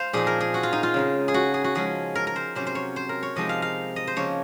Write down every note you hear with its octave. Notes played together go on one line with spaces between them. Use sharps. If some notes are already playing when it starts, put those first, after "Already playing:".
Already playing: C5 F5
A#2 F3 C4 D#4 G#4
A#4
G#4
F#4
F4
D#4
F4
C#3 G#3 D#4
G#4
F#4
G#4
F#4
F3 G#3 C#4 G#4
A#4
A#4
C5
C3 F#3 C#4 C5
C5
C#5
C5
A#4
C#5
C3 F3 G#3 C4 D#4 D#5
F5
F5
D#5
C5
C#3 F3 A#3 C#5